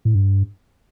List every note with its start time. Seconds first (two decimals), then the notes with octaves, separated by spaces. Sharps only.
0.05 A2
0.15 G2